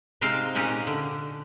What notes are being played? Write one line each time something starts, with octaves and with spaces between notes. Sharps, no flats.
C3 G#3 C4 D#4 F5 G5
A#2 C#4 D#4 G4 F#5 G#5
D3